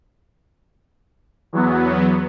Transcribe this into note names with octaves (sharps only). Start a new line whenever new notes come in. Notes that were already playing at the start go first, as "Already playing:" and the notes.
E2 F#3 B3